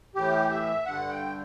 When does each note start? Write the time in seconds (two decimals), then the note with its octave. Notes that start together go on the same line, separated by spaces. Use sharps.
0.15 A2 E3 G4
0.50 E5
0.86 G2 D3 F#5
1.09 G5